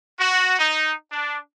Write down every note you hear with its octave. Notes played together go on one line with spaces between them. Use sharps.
F#4
D#4
D4